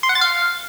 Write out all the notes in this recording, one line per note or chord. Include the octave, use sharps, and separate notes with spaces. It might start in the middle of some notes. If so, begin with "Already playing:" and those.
C6
F#5
A6
F5